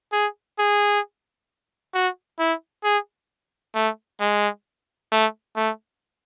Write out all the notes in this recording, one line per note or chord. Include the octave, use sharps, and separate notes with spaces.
G#4
G#4
F#4
E4
G#4
A3
G#3
A3
A3